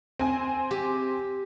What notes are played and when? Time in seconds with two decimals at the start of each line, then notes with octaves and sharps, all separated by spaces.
0.19 C4 G#5
0.71 G4